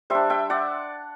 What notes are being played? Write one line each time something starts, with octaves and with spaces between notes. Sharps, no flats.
G3 D4 C5 E5
E5 G5
D5 F#5